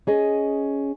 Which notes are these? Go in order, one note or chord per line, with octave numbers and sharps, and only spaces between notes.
C#4 G#4 D#5